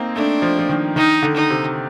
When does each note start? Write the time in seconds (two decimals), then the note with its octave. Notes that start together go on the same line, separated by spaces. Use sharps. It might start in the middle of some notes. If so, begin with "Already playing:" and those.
Already playing: A#3 C4 D#4
0.16 A3 D4
0.42 F3
0.59 F3
0.69 D#3
0.96 D#3 D#4
1.22 D3
1.36 D#4
1.50 C3